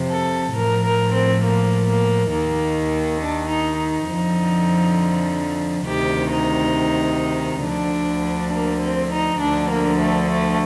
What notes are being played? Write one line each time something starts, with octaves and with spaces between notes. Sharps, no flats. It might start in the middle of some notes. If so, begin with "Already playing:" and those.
Already playing: F2 C3 F3
A4
A2 F3 A#4
A#4
C4
A#3
A#3
D#2 D#3 A#3
D4
D#4
D#4
F2 D3 F3
D2 C3 D#3 G4
D#4
D2 D3 F3 D4
A#3
C4
D#4
D2 D3 F3 D4
A#3
A3
A3